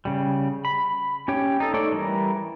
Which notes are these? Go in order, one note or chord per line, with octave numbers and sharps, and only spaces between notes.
C#3 G3
B5
C#4 G4 C#5 G5
D#4 A4
A3 D#4 A4 C#5 D5
E3 G3 A#4